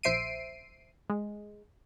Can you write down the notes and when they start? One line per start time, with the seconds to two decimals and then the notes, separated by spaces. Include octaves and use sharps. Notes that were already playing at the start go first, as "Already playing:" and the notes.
0.03 A#1 C5 E5 C7 D7 D#7
1.10 G#3